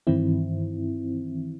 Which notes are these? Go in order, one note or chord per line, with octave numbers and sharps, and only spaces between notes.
G2 D#3 E3 C4 E4